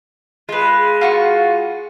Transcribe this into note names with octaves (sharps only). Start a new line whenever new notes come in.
G#3 F4 B4
F4 F#4 C#6